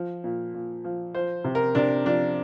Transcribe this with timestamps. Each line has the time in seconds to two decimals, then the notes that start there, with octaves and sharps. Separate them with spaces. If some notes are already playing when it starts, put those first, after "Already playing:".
Already playing: F3
0.24 A#2
0.54 A#2
0.84 F3
1.15 F3 C5
1.44 C3
1.55 A#4
1.75 C3 D4
2.05 F3 D4